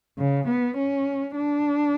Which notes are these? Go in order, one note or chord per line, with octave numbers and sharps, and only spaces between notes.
C#3
B3
C#4
D4